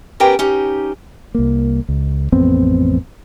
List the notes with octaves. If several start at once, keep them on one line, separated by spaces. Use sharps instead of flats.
B3 C#4 G4 A#4 B4 G5
C#4 D#4 G4
C2 A#3
C#2
A1 F2 B3 C4